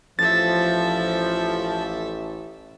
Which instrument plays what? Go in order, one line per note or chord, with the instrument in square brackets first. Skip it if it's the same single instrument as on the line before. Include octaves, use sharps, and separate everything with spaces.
[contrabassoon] A1 [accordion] F3 [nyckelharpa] A4 E5 [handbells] A6